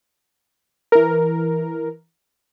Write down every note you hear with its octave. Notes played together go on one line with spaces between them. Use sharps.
E3 A#4